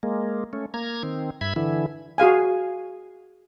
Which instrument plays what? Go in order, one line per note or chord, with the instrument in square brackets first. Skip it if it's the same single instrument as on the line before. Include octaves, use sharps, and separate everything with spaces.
[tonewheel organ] G#3 A#3
A3 C#4
A#3 A#5 G#6
D#3 C4
G2 E5 B5 G#6
D3 E3 E4
[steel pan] F#4 G#4 F5 G#5